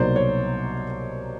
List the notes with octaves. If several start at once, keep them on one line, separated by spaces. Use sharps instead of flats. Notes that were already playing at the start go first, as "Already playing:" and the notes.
Already playing: C2 B2 F#3 A#3 D#4 C5 D5
C#5